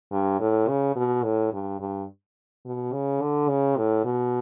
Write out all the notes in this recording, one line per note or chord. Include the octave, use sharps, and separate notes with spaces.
G2
A2
C#3
B2
A2
G2
G2
B2
C#3
D3
C#3
A2
B2